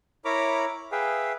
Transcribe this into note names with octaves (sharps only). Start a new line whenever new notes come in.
E4 A#4 C#5 A#5 B5 D6
G#4 B4 E5 F5 G5